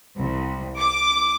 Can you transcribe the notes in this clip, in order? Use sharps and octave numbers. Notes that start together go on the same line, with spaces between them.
C2
D6